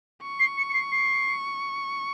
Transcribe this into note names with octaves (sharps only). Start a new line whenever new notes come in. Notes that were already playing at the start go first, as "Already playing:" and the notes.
C#6
C7
C#7
C#7
C7
C7